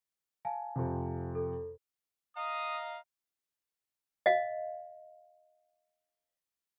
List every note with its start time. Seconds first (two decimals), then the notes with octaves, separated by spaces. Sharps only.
0.45 F5 G#5 A5
0.76 F2 C3
1.35 A4
2.37 D#5 F5 A#5 D#6
4.26 D#5 F5